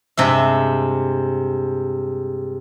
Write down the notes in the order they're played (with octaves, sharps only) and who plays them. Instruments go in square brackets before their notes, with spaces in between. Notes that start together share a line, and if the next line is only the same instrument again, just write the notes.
[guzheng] G2 C3 G#3 E5